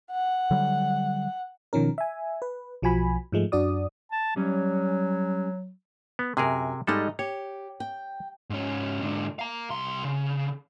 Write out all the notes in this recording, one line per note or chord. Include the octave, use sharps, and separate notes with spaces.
F#5
D3 F#3 G3
B2 D#3 F3 C#4 A#4
E5 G#5
B4
B1 F3 F#4 G#5 B5
G#2 F3 G#3 A3
F#2 D4 F#4 D5 D#6
A5
F#3 G3 C#4
B3
F#2 C3 G#4 A#4 G#5
G#2 G3 G#3 D#4 A4
G4 C#5
G5
G#2 C#4
G#2 D3
F5 A#5
C2 C6
C#3